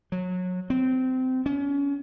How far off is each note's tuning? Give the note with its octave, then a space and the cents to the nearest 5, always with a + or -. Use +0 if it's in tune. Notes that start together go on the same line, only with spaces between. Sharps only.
F#3 -25
C4 -20
C#4 +30